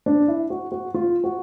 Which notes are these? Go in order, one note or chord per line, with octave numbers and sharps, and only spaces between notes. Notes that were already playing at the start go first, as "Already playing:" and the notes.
D4
E4
F#4
F#4
F4
F#4